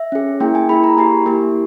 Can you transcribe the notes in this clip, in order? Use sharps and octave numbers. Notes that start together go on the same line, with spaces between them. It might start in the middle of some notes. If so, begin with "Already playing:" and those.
Already playing: E5
C#4 G#4
A#3 E4 G#4 G5
G#5
A#3 E4 G#4 B5
A#5
A#3 E4 G4 G#5
A#3 E4 G4